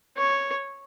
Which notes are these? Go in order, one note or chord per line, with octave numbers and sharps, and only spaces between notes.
C#5